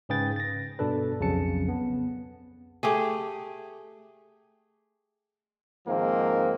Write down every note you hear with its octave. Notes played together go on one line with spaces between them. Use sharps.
G#2 C#3 G#4 B4 G5 A6
A6 A#6
G2 B2 D4 A4 B4
B1 F2 C#3 F#3 A5 C#7
B3
A3 G4 G#4
G#2 D#3 F3 A#3 C4